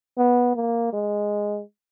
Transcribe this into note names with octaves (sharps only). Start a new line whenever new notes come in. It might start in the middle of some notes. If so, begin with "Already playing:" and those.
B3
A#3
G#3